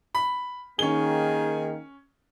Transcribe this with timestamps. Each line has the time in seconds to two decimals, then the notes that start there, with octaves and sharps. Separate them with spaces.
0.15 B5
0.79 D#3 A#3 C#4 G#4 G7